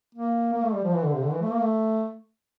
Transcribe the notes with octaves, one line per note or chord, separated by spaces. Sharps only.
A#3
A#3
A3
G3
F3
E3
D3
C3
D3
E3
A3
A#3
A3